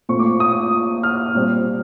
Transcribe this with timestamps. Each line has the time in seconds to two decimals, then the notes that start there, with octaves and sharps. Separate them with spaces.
0.09 A#2 F3 A3 C4 C#6
0.19 D6
0.40 D#6
1.03 F6
1.35 A#2 G3 C4